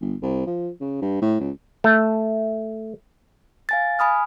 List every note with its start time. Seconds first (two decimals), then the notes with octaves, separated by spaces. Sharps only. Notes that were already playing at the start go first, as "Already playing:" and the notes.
0.01 G1
0.22 C2
0.47 F3
0.81 C#3
1.02 G2
1.22 A2
1.40 C#2
1.84 A3
3.69 F5 G#5 A6
3.99 G#5 B5 D#6 F6